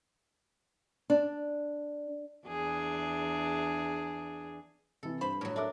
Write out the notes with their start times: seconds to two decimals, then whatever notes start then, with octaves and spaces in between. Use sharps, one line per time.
1.10 D4
2.48 E2 D4 G#4
5.03 C3 E3 A4
5.21 G2 B4 C5 B5
5.41 A2 F#3
5.56 D4 A4 A#4 E5 D6